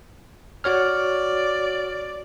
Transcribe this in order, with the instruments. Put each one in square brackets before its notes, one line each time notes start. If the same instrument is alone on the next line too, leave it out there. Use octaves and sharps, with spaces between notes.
[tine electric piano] F#4 C#5 F6 [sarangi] D5